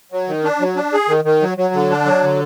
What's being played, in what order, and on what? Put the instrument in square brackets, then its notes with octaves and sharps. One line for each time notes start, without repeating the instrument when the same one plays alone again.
[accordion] F#3
D#3
D4
F#3
D4
G#4
D#3
D#3
F#3
F#3
D3
D4
F#3
D3